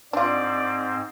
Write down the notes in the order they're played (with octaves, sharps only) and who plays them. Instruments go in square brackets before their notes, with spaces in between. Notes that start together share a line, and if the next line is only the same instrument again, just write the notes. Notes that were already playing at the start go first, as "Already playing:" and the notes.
[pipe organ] G#2 C4 [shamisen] D4 F4 [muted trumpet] D5